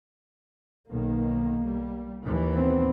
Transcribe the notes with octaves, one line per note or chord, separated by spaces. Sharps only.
B1 D#3 A#3
G3
D#2 E3
B3 C4